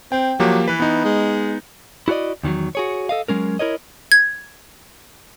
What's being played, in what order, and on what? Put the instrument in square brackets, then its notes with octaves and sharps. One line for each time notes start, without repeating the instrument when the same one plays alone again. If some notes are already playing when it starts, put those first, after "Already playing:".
[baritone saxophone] C4 [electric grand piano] G5
[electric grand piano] F3 A#3 G4 [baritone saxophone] F#3
[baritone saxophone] E3 [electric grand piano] B4
[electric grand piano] B3 D#4
[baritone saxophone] G#3
[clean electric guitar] E4 F#4 G#4 D5 D#5
E2 D#3 E3 F#3
F#4 G#4 C#5
A4 D#5 F5
F#3 G#3 C#4 A#4
E4 A#4 C#5 D#5
[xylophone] G#6